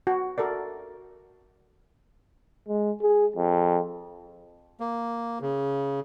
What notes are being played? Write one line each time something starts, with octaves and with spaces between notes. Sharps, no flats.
F#4
F#4 A4 A#4 D5
G#3
G#4
F2
A#3
C#3